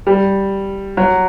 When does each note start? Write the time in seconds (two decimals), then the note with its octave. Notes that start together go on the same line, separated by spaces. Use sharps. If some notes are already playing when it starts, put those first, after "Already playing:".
0.07 G3
0.97 F#3